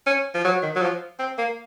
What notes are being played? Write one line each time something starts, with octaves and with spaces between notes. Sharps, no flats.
C#4
F3
F#3
D#3
F#3
F3
C4
A#3